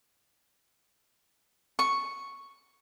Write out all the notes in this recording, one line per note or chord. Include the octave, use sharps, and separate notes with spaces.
C#6